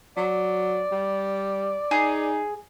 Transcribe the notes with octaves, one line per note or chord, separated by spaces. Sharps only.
F#3 D5
G3
D#4 G#4